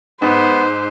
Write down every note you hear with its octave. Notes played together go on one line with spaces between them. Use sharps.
G#2 B3 C5